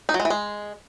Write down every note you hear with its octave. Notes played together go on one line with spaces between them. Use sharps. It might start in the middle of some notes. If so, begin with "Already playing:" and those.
D#4
F#3
G#3
E3
G#3